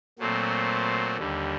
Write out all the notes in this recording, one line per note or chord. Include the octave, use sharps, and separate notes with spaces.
A#2 F#3 A3 C4
D#2 D3 G3